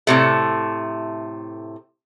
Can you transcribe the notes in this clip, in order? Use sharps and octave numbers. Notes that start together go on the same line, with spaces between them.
A2 C3 A3